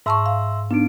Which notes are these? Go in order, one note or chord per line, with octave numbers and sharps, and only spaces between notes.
G#2 E5 A5 C6 C#6 E6
F5
B3 D4 D#4 D7